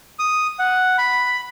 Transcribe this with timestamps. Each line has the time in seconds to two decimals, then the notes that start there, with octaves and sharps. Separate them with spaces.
0.19 D#6
0.59 F#5
0.98 B5